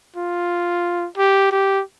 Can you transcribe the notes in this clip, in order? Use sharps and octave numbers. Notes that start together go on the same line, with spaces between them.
F4
G4
G4